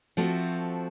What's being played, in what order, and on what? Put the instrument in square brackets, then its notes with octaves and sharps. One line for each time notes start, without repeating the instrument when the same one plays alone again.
[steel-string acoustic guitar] F3 A3 C4 F#4